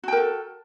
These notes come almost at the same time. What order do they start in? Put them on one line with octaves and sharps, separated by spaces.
F#4 G5 A#4 A4